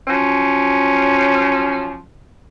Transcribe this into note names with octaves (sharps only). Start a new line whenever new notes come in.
F3 F#3 C#4